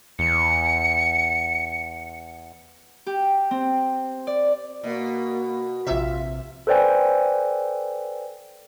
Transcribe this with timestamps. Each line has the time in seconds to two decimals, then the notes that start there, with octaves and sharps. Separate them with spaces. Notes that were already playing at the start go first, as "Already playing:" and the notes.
0.19 E2 C#7
3.07 G4
3.51 C4
4.27 D5
4.84 B2 A#3 F#4
5.86 A#1 C3 F4 E5
6.67 A4 B4 C5 D5 G5 G#5